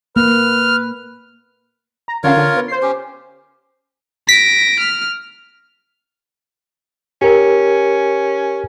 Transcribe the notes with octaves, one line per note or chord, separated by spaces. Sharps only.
A#3 B4 F6
A#5
D3 C#4 F4 A#4 C#5 F5
D3
B3
C5 C7
C#4 G4
A#6 B6 D7
F6
C#4 G4 A#4